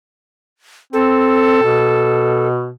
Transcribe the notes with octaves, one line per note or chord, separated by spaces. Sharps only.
C4 A4
B2